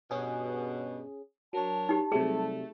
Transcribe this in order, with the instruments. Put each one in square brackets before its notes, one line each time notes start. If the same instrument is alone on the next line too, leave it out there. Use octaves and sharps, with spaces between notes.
[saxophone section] G2 B2 [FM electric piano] C#4 G#4
[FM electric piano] F#3 [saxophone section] D4 A#4 C#5 [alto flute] A5
[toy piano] D#4 G4
[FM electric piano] C3 F#3 G3 [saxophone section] A3 [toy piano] G#4